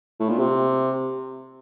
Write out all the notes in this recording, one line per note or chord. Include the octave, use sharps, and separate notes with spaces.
A2
A#2
C3